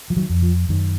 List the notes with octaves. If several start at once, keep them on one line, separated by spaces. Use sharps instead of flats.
F3
D#3 F#3
F2
F3
F#2 D#3